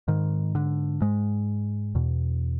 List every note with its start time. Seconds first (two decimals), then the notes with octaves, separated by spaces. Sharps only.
0.08 G#2 D#3
0.55 D3
1.01 G#2 G#3
1.95 E2 B2